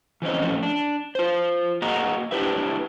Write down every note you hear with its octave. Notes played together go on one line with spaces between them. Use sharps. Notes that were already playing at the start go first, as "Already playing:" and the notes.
E3 C4 C#4 D#5
A2 F3 A3 A#3 C#4
D4
F4 C5
A#3 F#4 G#4 D#5 F#5 A#5
D4 E4 G4 B4 E5